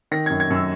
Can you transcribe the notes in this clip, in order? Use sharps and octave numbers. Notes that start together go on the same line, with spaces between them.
D#3 A#6
F#2 G#6
G#6
F#2 E6